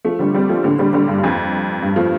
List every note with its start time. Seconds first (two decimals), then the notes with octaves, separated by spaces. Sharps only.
0.05 F3 A3
0.19 D3 G3
0.34 G3 C4
0.49 F3 A3
0.64 A2 D3
0.79 D3 G3
0.93 D3 G3
1.08 G2
1.23 F2
1.82 G2
1.96 F3 A3